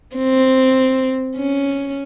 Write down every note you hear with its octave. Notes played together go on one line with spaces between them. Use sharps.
C4
C#4